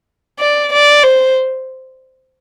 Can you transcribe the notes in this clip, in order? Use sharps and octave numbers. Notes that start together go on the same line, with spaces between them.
D5
D5
C5